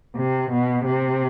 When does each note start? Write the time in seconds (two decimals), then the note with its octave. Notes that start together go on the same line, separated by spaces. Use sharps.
0.16 C3
0.50 B2
0.85 C3